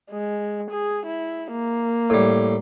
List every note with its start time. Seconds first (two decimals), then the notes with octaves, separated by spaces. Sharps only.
0.11 G#3
0.71 G#4
1.06 E4
1.51 A#3
2.10 A2 G3